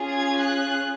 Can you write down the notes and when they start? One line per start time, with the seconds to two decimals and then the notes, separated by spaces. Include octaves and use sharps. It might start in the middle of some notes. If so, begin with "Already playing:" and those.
Already playing: C#4 F4 G#4
0.09 G#6
0.43 F#6